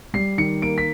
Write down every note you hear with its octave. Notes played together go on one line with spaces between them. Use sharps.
G3 C7
D#3 C#7
A#3 D7
B6